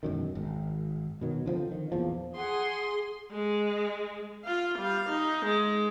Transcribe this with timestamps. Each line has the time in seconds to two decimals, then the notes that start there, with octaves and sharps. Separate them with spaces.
0.03 E1 F#2 D#3
0.35 G#1
1.21 B2 D#3 F#3
1.46 D3 F3 A#3 C4
1.71 D#3
1.92 A#1 E2 A#2 F3
2.37 G#4 F#5 C6
3.32 G#3
4.44 F4 F5
4.78 G3 F5
5.09 D#4
5.46 G#3